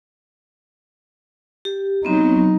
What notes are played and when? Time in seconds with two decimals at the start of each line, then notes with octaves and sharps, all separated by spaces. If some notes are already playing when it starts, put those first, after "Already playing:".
1.65 G4
2.05 F#3 B3 C4 D#4